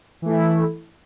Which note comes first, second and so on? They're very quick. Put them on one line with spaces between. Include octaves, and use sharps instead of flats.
E3 A3 E4